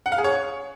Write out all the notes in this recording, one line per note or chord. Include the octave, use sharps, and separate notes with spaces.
F#5
F5
G#4
C#5